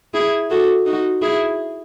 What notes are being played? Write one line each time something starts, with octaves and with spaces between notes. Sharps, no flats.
E4 G#4
F#4 A4
D#4 F#4
E4 G#4